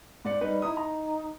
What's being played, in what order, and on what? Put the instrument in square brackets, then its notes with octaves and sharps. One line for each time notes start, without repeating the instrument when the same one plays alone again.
[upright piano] G#2 D5 C#7
[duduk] G3 [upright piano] D#4 B4
[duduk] D#4 [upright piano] E4 D#6
[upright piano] A#5